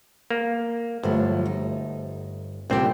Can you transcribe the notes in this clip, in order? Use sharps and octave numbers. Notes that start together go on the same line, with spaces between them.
A#3
G1 F3 F#3 A3
D#4
C2 A#2 D3 C4 G4